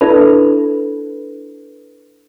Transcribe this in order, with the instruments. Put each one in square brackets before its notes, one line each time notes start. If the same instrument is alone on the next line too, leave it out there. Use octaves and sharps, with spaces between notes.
[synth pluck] D4 E4 A4 B4